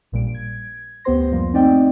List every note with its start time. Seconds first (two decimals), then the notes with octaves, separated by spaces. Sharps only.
0.12 A#1 A#2 G3 D7
0.35 G#6
1.04 D2 B3 G4 C5 C6 A#6
1.31 F#2 F3 G3 A#3
1.53 A3 C4 D#4 D5 D#5 G5